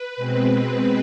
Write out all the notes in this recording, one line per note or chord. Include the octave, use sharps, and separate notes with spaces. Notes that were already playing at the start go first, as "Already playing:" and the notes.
Already playing: B4
B2 G#3 C4